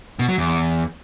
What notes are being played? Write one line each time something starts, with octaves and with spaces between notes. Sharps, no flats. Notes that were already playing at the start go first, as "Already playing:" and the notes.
B2
F#3
E2